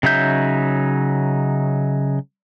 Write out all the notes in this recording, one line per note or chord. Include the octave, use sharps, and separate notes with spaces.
C#3 F#3 D#4 E5 G6